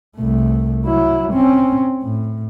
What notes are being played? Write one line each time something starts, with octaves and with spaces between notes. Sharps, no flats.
C2 A3
F#3 E4
C4 C#4
A2